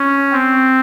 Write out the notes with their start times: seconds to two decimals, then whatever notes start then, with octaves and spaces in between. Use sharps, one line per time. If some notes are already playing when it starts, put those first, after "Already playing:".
Already playing: C#4
0.32 C4